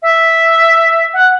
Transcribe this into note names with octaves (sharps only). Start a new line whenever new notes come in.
E5
F#5